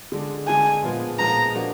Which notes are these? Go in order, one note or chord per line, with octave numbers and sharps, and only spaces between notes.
D3 G#3 D4
D3 G#3 D4 G#5
A#2 F3 G#3 B3 F4
A#2 F3 G#3 B3 F4 A#5
F3 A#3 D4 F#4